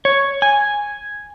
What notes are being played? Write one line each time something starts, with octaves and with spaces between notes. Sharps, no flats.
C#5
G#5